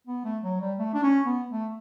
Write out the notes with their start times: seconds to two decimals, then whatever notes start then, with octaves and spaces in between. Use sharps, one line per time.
0.07 B3
0.25 A3
0.43 F#3
0.60 G3
0.79 A3
0.94 D4
1.03 C#4
1.26 B3
1.50 A3